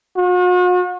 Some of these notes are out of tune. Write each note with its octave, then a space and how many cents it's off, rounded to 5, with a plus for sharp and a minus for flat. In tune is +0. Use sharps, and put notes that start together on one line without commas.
F#4 -45